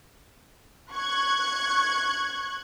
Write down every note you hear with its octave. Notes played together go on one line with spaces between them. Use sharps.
C#6 F#6 G#6